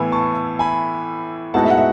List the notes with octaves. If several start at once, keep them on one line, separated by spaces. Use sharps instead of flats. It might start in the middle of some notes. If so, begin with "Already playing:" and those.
Already playing: A2 E3 B3 E4 G#5 B5
A5 C#6
G#5 B5
A2 G#3 B3 D#4 F#4 F#5 A5
E5
F#5
E5